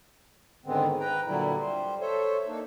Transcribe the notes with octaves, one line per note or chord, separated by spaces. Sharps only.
G#2 D3 D#3 G#3 B3 C4
B4 G5 A#5
A#2 D3 F#3 G3 E4
G3 C5
A4 C5 C#5 E5
A#3 D4 D#4 A4